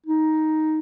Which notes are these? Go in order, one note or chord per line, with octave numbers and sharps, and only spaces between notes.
D#4